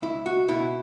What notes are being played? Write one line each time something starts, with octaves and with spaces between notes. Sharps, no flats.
C#2 E4
F#4
B2 E4